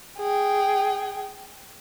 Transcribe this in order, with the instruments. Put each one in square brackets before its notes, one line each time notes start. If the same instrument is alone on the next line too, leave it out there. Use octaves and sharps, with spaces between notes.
[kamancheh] G#4 G5